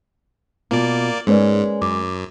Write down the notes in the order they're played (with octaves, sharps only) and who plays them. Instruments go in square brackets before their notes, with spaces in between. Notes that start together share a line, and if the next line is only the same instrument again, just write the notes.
[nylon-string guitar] B2 F4 [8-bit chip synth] A#3 D5
[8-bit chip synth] G#2 [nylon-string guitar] G#3 A#3 C#4 [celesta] G#4 B4 D5
[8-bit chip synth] F#2 [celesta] D6